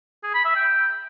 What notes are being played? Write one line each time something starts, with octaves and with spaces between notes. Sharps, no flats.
G#4
B5
E5
G5